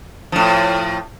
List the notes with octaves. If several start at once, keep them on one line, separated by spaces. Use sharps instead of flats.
A2 F3